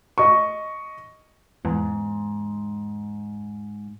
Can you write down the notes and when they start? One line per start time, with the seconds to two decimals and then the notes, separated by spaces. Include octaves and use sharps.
0.18 D#5 C#6
1.65 E2 G#2